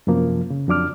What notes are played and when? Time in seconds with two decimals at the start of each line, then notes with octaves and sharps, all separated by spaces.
0.07 F#2 C3 F3 A#3
0.50 C#3
0.68 F2 F#3 D4 D6 F6